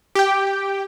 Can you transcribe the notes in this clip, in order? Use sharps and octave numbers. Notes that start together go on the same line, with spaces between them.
G4 G5